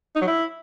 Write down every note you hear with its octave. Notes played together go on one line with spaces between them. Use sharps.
D#4
F#3
E4